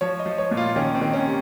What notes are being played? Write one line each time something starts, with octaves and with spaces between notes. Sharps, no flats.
F3 C#5
D#5
F3
C#5
A#2
F4
D#3 C#4
C4
D#3
C#4
C3